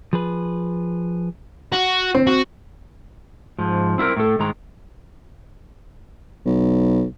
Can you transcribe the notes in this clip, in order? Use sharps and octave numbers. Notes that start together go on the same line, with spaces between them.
F3 G#4 B4
F#4
C4
F#4
G#2 F3
C4 E4 F4 A#4
A2 A4
G#2 D#3 G#3 A#5
B1